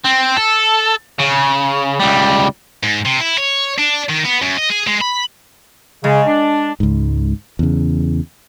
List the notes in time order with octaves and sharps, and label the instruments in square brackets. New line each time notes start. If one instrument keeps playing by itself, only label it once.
[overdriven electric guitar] C4
A4
C#3
C#2 G3
[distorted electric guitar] G#2
C3
E4
C#5
D4
D#3
B3
F#2
D#5
G#4
G#3
B5
[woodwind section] C#3 [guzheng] G#3
[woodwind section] D4
[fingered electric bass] C#2 G#2
E2 C#3